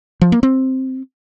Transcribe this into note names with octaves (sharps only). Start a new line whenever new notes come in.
F3
A#3
C4